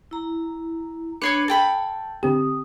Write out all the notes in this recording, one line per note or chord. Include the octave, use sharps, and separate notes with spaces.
E4 A#5
D4 B4 C#5 D6 G#6 C7 C#7
A4 G5 A5 B5
D3 C4 G4 D#6